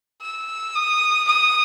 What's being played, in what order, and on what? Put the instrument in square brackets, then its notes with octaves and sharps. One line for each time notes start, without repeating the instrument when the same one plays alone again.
[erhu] E6
D#6
D#6